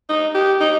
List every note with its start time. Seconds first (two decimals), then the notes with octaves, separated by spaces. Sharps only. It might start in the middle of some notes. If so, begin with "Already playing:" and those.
0.09 D#4
0.35 G4
0.61 D#4